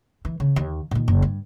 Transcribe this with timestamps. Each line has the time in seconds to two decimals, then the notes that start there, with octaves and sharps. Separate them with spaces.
0.25 E3
0.40 C#3
0.56 D#2
0.91 A#2 D#3
1.08 F#1
1.22 G2